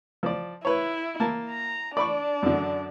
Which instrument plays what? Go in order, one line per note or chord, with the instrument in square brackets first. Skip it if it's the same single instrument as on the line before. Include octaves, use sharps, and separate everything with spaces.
[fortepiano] F3 D5
[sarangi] E4 [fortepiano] B4 C#5
[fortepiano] A#3 A5
[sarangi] A#5
[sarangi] D4 [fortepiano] D5 B5 C#6
[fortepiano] F#2 D3